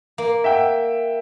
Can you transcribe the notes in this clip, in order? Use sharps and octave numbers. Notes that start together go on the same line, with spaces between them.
A#3
E5 F#5 G5